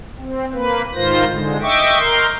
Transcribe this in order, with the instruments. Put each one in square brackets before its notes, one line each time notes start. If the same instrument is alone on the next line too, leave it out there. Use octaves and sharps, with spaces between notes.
[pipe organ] C4
A#3 B4
G#2 D#3 F4 C5 A#6
D3 G#3
D#5 E5 G5 C#6 D6
A#4 C6 G6